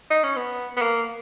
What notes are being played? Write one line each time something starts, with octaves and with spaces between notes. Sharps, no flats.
D#4
C#4
B3
B3
A#3